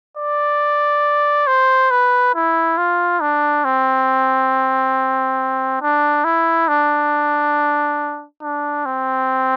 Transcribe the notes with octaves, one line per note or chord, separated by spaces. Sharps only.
D5
C5
B4
E4
F4
D4
C4
D4
E4
D4
D4
C4